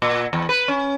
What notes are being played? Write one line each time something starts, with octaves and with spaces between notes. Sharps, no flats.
A#2
E2
B4
C#4